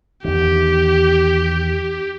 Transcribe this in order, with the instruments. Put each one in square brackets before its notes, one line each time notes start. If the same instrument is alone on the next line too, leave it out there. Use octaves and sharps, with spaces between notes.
[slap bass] E2 D#3 [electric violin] G4